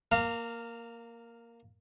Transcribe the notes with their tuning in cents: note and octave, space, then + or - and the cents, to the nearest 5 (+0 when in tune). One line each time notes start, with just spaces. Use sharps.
A#3 +0 F5 +0 A#5 -25